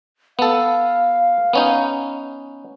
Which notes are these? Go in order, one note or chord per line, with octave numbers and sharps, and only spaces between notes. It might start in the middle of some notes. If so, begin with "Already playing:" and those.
B3 A4 F5
B3 C#4 D#4